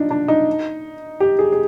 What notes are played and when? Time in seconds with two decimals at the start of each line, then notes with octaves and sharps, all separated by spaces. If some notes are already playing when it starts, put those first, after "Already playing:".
Already playing: D4 D#4 F4
0.11 D4
0.28 D#4
1.20 G4
1.39 G#4
1.52 G#4